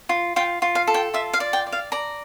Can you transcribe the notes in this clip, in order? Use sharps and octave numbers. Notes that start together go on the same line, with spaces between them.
F4
F4 G5
F4
F5
A4
G5
F4 E5
F5
D5
G5
D5
F5
D5 A#5